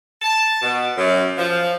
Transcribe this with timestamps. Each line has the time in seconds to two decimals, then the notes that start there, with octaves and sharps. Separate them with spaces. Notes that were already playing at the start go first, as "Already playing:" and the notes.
0.22 A5
0.62 B2
0.97 F#2
1.37 F3